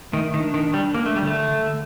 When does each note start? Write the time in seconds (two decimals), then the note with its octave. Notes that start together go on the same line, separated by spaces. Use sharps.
0.13 D#3 A3
0.34 D#3
0.40 D4
0.54 D#3
0.67 D4
0.74 G3
0.94 A#3 D4
1.06 A3
1.16 G3
1.22 D3
1.27 A3
1.48 D3